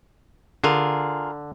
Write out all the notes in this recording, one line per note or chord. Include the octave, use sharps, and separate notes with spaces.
D3 F4 G#4 A#4